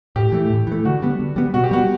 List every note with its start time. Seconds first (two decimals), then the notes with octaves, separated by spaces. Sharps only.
0.16 A2 G4
0.32 E3 A3
0.50 A2
0.67 E3 A3
0.85 D3 F#4
1.02 G3 B3
1.19 D3
1.36 G3 B3
1.54 B2 F#4
1.64 G4
1.71 G3 B3 F#4